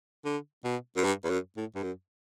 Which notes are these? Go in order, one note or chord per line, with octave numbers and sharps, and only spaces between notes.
D3
B2
F#2
G2
E2
F#2
A2
G2
F#2